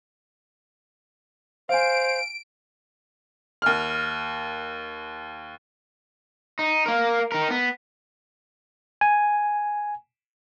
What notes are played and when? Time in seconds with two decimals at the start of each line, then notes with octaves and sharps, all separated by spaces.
1.69 C5 F5 G#5 D7
3.62 D#2 F6
6.59 D#4
6.86 A#3 A#4
7.32 D#4 A#4
7.50 B3
9.01 G#5